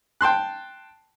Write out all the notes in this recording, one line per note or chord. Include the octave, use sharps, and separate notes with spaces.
G5 A5 C6 F#6